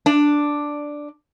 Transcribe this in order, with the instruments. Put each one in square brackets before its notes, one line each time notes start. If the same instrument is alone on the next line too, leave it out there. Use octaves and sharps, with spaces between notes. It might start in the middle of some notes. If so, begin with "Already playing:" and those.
[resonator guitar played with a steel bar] D4 D5